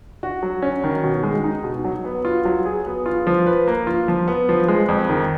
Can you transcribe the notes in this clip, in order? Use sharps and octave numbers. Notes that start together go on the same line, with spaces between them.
F#4
F#3
C#4
D#3
B2
G#3
D#4
B2
F#3
B3
F4
F#3
G#4
B3
F4
F3
B4
A#3
F4
F3
B3
F3
G#3
F2
D#3